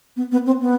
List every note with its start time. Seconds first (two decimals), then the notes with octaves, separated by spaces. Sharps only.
0.16 B3
0.32 B3
0.46 C4
0.61 B3